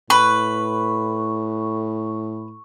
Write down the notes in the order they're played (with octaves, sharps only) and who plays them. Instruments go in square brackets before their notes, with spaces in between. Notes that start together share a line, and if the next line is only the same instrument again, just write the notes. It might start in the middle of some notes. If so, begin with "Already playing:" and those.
[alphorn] A2 [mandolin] B4 [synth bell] C#6